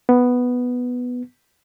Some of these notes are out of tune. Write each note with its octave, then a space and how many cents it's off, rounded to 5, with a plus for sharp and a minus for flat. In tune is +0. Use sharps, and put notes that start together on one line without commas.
B3 +0